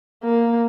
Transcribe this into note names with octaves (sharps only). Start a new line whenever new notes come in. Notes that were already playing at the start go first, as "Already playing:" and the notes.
A#3